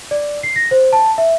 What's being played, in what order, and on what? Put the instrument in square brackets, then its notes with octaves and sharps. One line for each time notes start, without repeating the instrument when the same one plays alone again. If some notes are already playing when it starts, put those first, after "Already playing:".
[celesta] D5
C7
A#6
C5
A5
E5